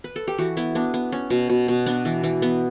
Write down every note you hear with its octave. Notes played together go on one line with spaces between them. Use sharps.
B4
A4
G4
E3 F#4
B3 E4
B3 D4
B3
C#4
B2
B2
B2
B3 D4
E3
E3
B3